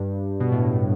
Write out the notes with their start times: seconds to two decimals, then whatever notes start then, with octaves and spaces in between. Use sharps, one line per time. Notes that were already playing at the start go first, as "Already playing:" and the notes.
Already playing: G2
0.40 B2
0.52 A2